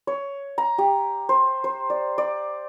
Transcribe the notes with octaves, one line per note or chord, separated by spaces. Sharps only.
C#5
A#5
G4
C5
C5
D5
D5